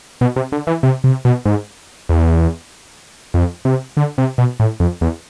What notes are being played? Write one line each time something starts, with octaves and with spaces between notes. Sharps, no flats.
B2
C3
D3
E3
C3
C3
B2
G#2
E2
F2
C3
D3
C3
B2
A2
F2
E2